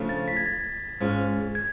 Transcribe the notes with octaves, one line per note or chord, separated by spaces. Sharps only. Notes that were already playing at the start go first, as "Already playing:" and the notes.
Already playing: C#3 F3 A3 D4 F4
A6
B6
G#6
A6
G#2 G#3 C#4 F4
G#6